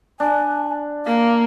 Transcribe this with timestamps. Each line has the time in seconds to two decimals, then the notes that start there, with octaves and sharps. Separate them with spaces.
0.20 D4 G#5
1.06 A#3 F5